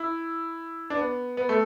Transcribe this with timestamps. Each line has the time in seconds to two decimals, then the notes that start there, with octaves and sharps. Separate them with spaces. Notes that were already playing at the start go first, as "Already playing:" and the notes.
Already playing: E4
0.90 D4
0.97 B3
1.37 B3
1.49 A3